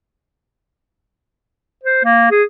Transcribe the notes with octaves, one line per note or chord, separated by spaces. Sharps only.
C5
A#3
G#4